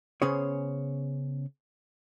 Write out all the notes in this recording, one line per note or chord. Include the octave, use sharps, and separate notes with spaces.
C#3 B3 C#4 G#4 C5 C#5